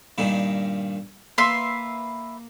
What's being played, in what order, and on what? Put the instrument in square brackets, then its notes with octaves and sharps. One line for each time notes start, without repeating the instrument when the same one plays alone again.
[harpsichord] G2 A#2 D#3
[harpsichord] A#3 [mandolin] B4 E5 C6